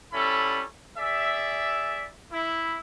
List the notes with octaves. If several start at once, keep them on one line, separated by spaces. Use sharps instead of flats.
G3 C#4 E4 A4 B5
G#4 D5 E5
E4